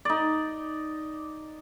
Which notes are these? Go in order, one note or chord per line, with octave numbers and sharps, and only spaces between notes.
D#4 D5